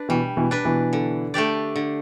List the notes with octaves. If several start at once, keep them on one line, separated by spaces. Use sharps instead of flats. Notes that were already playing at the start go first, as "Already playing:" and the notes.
Already playing: D4 B4
B2 E3 G3
B2 E3
D4 B4
B2 E3
D3
A3 D4 G4 D5
D3